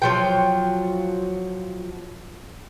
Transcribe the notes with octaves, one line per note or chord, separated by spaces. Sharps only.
F3 F#3 G5